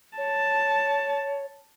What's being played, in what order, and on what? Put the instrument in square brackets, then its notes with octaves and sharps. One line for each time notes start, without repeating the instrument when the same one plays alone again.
[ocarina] C#5 [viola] A5